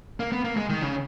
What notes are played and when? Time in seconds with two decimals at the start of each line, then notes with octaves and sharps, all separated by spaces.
0.20 A#3
0.32 B3
0.45 A#3
0.57 G#3
0.69 D#3
0.82 C#3